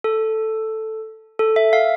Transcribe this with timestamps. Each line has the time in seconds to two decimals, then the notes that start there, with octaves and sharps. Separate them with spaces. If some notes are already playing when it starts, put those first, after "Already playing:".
0.04 A4
1.39 A4
1.56 E5
1.73 F5